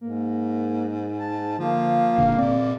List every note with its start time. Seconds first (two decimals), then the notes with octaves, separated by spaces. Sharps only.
0.01 G#2 A#3
1.19 A5
1.59 D3 F3 A#3
2.18 F1 A#2 D3 F5
2.38 A#2 C4 D5